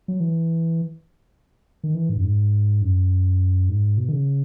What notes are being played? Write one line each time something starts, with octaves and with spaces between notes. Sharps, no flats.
F#3
E3
D#3
E3
G#2
F#2
G#2
F#2
G#2
B2
D#3
C#3